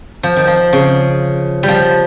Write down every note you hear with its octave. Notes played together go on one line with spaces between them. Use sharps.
F3
D#3
F3
C#3
G3
F3